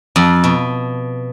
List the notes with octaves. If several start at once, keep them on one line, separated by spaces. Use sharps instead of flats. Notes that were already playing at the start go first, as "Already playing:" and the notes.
F2
B2